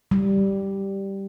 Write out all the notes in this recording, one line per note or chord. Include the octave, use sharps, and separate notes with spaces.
G3